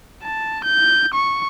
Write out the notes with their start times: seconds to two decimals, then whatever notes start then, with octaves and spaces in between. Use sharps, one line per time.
0.23 A5
0.64 G6
1.14 C#6